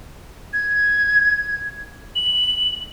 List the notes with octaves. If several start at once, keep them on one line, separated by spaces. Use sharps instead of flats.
G#6
F#7